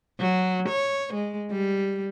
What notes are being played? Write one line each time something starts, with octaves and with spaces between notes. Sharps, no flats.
F#3
C#5
G#3
G3